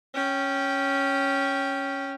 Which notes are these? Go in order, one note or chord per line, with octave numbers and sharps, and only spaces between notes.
C#4 G5